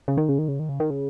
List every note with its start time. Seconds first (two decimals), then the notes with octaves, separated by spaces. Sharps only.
0.08 C#3
0.17 D#3
0.29 C#3
0.38 D#3
0.48 C#3
0.59 D#3
0.69 C#3
0.80 D#3
0.90 C#3